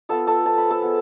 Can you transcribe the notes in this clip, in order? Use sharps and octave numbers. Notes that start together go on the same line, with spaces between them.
B3 F4 A4 A5
A4 A5
F3 A5
B5
A4 A5
G#3 B3